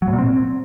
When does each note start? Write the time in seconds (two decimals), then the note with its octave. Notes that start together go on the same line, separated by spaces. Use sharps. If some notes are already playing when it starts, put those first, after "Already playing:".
0.02 F#3
0.08 A2
0.13 A#2
0.18 C4